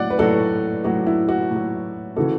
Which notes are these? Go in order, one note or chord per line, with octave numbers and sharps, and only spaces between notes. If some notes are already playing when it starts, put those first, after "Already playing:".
Already playing: A2 F#3 D5 F#5
B4
A2 F#3 F#4 A4
A2 F#3 F#4
E4
F#4
A2 F#3
C#3 E3 F#4 A4